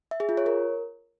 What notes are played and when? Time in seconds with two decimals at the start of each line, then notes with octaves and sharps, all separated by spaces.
0.11 E5
0.20 G#4
0.29 F4
0.37 C#5
0.46 A#4